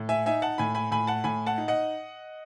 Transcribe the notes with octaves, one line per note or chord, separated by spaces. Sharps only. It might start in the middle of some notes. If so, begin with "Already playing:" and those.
Already playing: A2
E5 G#5
D#4 E5 G#5
F#5 A5
A2 G#5 B5
G#5 B5
A2 G#5 B5
F#5 A5
A2 G#5 B5
F#5 A5
D#4
D#5 F#5